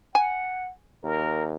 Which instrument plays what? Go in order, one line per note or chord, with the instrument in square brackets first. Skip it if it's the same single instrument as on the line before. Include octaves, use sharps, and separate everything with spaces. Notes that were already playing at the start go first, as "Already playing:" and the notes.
[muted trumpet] F#5 [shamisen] G#5
[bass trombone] D#2 [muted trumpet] A#4